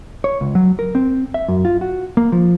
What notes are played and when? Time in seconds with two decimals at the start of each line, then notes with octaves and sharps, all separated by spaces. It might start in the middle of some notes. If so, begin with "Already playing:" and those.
0.24 C#5
0.41 C#2
0.55 F#3
0.79 A#4
0.95 C4
1.34 E5
1.48 F#2
1.65 F4
1.81 F#4
2.17 A#3
2.32 F3